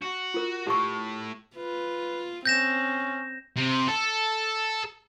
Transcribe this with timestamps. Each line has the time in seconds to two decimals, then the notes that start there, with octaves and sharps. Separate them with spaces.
0.02 F#4
0.34 F4 A#4
0.67 A2 G4 C#6
1.56 F4 B4
2.45 C4 C#4 G6 A#6 E7
3.57 C3
3.88 A4